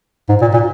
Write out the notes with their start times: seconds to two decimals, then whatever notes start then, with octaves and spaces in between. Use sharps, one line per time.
0.29 G#2
0.42 A#2
0.53 A#2